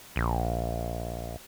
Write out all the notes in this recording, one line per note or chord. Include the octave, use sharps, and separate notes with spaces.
A#1